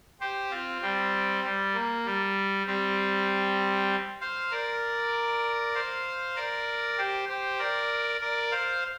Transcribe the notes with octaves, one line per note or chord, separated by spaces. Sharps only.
G4 C5
C4 F4
G3 C4
G3
A#3
G3
G3 C4
C5 F5
A#4 D5
C5 F5
A#4 D5
G4 C5
G4 C5
A#4 D5
A#4 D5
C5 F5